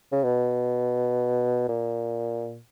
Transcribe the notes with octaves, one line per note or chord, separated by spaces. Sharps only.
C#3
B2
A#2